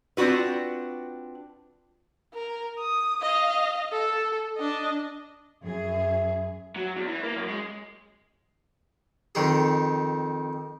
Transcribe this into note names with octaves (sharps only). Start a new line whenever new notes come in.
C4 D4 F4 F#4 B4
A#4
D#6
D#5 F5
A4
D4 D#5
F#2 G#4 E5
F#3
E2
E3
A#3
F#2
G#3
F2 D#3 G#4